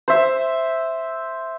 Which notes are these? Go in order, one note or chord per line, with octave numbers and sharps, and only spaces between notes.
C5 E5